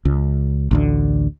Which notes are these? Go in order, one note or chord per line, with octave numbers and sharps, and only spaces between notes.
C#2
A1 D2 D3